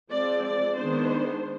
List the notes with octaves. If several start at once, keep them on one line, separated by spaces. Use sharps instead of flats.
F3 G#3 C4 D5
D5
D#3 G#3 B3 D4 C5